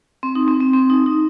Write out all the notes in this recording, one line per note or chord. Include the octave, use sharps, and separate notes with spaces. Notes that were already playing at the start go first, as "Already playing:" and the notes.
C4
D#4
C4
C4
C4
D#4
D#4